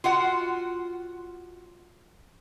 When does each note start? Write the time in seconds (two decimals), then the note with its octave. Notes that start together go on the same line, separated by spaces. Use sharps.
0.04 F4 F#4 F#5